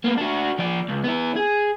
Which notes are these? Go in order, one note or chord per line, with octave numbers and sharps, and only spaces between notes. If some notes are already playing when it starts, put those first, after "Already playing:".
A#3 B3
D4 F#4
F3 D5
C#2
B3 E4
G#4